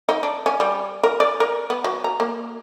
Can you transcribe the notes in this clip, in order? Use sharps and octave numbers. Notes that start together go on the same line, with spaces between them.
D#4
D4
C#4
G3
A#4
D5
A#4
B3
F#3
A#5
A#3